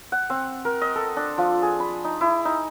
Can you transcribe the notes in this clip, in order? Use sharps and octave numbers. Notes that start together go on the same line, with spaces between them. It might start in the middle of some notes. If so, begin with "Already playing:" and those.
F#5
C4
A#4
D#5
A4
D4
F3
G#4
B5
D#4
E4
D#4